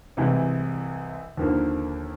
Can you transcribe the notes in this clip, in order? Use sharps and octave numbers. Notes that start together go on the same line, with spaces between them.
C2 C3 E3 G#3
D#2 D3 F3 A#3